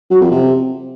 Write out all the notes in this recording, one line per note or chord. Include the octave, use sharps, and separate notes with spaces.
F#3
F2
C3